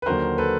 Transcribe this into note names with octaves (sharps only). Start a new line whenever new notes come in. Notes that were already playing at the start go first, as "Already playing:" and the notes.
B4
D#2 D3 F#3 A#4 C5
A4 B4